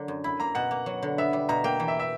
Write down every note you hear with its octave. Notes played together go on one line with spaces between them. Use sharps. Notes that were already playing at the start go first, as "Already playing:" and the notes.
Already playing: D3 F#3 A#3
F#2
E4 B5
A#3 A#5
B2 F#5
A#3
F#3
D3
B3 E5
G3
B2 A#5
A#3 G5
E3
E5
E5